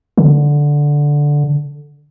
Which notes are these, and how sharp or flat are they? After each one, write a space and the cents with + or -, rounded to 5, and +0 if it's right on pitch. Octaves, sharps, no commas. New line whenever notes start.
D3 -5